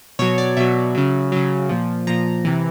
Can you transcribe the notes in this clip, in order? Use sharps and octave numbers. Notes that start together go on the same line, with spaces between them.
B2 F#3 C#5
D5
B2 F#3 E5
C#3 F#3
C#3 F#3
A#2 F3
A#2 F3 A#5
C3 E3